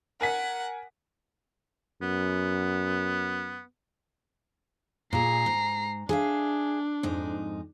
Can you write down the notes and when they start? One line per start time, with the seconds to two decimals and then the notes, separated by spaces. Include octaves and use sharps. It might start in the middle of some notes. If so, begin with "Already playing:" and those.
0.21 A#4 F#5 G#5 B6
2.02 F#2 B3
5.13 A#2 G#4 A#5 C7
5.46 G#2
6.09 D4 G#4 E5 F5
7.03 F2 G#2 D#4